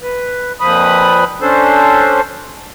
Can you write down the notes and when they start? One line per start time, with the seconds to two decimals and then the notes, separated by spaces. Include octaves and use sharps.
0.02 B4
0.60 F2 A#2 F3 B4 B5 D#6
1.41 C#4 D4 A4 C5